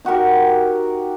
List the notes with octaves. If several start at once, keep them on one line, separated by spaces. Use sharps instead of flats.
D#4 F#4 G4 A#4